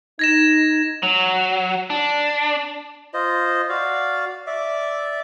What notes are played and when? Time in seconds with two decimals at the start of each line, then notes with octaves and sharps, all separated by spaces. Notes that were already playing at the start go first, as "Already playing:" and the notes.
0.19 D#4 G#6 A#6 E7
1.03 F#3
1.90 D4
3.14 F4 C5 D#5
3.69 F#4 D5 F5
4.47 D5 E5 D6